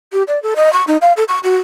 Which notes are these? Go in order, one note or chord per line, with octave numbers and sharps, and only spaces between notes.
G4
D5
A4
D#5
C#6
D#4
F5
A4
C#6
F#4